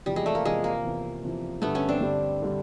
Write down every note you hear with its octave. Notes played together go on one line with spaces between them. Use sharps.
E2 C3 F3 G3
G#3
A3
A#3
E2 C3 F3 G#3
A#3
E2 C3 F3
E2 C3 F3
G2 D3 G3 A3 B3
B3 C#4
C4 D4
G2 D3 G3
D3 G3